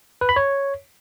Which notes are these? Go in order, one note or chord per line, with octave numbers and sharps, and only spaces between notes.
B4
B5
C#5